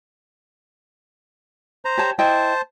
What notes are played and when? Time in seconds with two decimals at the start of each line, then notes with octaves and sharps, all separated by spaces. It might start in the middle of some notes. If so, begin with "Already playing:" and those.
1.85 C5 A#5
1.98 G4 C#5 A5
2.19 E4 C5 D#5 G5 A5